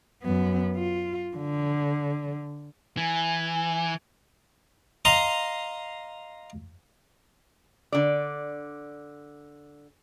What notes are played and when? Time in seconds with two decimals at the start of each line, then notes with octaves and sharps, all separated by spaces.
0.23 F#2 B3
0.76 F4
1.37 D3
2.97 E3 G#5
5.05 D#5 F5 A#5 C6
7.92 D3 D5